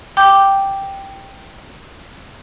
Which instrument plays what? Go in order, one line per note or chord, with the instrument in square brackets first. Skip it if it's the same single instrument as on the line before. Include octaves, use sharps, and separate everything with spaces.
[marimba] G5 D6 G6